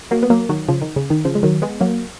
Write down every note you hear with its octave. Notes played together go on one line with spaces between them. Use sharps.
F#3 A#3
B3
F#3 A#3
D#3 F#3
C#3 F3
D#3
C#3
D#3
C#3 F3
G#3
D#3 F#3
G#3 B3
F#3 A#3